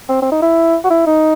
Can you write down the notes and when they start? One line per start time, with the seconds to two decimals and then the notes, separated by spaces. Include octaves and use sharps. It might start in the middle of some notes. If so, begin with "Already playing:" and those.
0.09 C4
0.22 C4
0.32 D#4
0.42 E4
0.84 F#4
0.90 E4
1.07 D#4